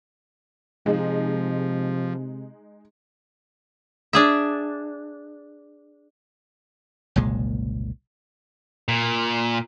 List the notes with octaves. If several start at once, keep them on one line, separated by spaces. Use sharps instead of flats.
C3 F3 G#3 D#4
D4 G#4 E5
F#1 C2 A#2 G#3
A#2